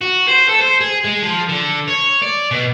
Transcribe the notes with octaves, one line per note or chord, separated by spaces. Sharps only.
F#4
C5
A4
C5
G#4
G#3
F3
D3
C#5
D5
B2